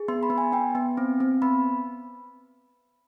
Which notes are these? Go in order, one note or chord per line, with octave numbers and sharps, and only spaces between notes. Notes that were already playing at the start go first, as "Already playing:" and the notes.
Already playing: G#4
B3 C6
B5
B3
G#5
B3 G5
B3
C4
C4
B3 B5